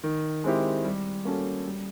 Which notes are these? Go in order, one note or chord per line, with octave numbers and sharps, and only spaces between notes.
D#3
G#3 C4 E4 G4
G3
A#3 C#4 F#4 A4
G3